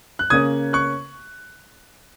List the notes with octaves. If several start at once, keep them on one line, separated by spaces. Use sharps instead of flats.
F#6
C#3 A#3 C#4 D#6 G#6
C#6 F#6